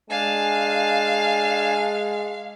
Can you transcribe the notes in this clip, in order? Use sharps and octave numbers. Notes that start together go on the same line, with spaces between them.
G#3 D4 F5 G#5 A5